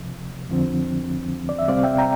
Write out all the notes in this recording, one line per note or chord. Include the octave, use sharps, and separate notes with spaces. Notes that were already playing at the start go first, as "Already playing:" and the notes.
Already playing: C2 C3 F3
F2 D3 F3 C4
D5
E5
C2 C3 G3 C4 D5 F5
E5 G5
G5 A#5